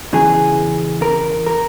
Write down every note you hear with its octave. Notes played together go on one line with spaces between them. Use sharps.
E2 C#3 E3 G#4
A#4
A#4